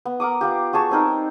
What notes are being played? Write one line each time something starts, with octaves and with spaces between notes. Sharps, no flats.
B3
A#4 F#5 D6 D#6
B3 F4 G4
F#4 G#4 A5 C#6
G3 C4 D#4 A#4